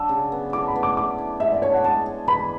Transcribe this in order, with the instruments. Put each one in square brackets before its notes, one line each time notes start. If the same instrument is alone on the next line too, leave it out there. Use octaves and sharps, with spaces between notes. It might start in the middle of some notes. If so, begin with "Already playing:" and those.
Already playing: [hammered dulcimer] F#3 D4 [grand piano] E6
[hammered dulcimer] C#3
B3
[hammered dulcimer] A2 [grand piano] D6
[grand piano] B5
[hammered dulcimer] B3
[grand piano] D6
[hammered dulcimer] A3 [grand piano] D6
[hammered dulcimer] E4
[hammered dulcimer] G#3 [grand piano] E5
[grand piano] D5
[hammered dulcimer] D4 [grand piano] C#5
[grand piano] F#5
[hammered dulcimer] G#3 [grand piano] A5
[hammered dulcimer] G#4
[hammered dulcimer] E3 [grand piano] B5